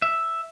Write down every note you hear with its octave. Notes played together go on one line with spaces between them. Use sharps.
E5